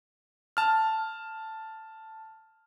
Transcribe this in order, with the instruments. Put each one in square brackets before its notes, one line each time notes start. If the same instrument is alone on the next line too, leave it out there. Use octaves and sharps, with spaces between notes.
[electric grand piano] A5 F6